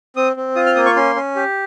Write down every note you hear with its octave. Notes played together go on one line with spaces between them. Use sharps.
C4 D#6
C4
F4 D#6
F6
A#3 D#6
C#6
C#4 C6
C#4
G4